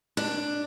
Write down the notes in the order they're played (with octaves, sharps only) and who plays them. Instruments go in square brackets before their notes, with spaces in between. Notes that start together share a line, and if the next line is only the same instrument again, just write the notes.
[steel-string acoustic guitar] D4